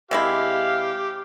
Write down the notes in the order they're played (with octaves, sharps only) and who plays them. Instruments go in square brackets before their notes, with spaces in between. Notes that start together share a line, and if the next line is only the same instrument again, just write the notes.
[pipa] C3 G#3 E4 [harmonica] G4 [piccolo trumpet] F5